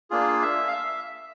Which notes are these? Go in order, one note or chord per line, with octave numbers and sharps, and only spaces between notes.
A#3 D4 F4 G#4
E5
F5
E5